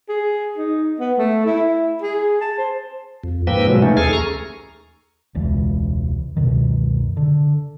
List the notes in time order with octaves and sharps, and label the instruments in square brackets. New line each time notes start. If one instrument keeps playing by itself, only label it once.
[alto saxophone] G#4
D#4
B3
A3
E4
G#4
A5
C5
[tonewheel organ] F2
G#2 F3 A#3 B4 G5 E6
B2 F#3 G#3
E3 A3 C#4 D#4
D#2 G#4 A4 G#5 F6
A#5 C#6
[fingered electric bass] E1 C#2 E3
C#2 F#2 B2 D#3
D3